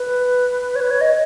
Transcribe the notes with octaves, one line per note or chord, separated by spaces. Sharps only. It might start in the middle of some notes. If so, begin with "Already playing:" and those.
Already playing: B4
C#5
B4
C#5
D#5